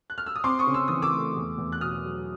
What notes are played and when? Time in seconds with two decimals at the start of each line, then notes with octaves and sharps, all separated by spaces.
0.10 F#6
0.18 F6
0.26 E6
0.35 D#6
0.44 C4 C6 D6
0.59 C#6 D#6
0.67 C#3
0.74 E6
0.88 E3 D#6
1.02 D6 E6
1.13 A3
1.36 E2
1.58 E2
1.72 F#6
1.81 B2 D#6 F6
2.04 F#3